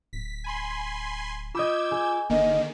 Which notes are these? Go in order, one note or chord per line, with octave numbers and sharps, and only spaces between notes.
D1 B6
G#5 B5 C6
F4 D#5 B5 D6 E6 G6 G#6
G#4
G1 D3 D#3 A#3 D#5